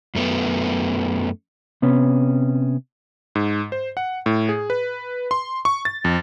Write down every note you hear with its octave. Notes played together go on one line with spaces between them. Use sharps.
F#2 A3 B3
C3 B3 C#4
G#2
C5
F#5
A2
G#4
B4
C6
C#6
A6
F2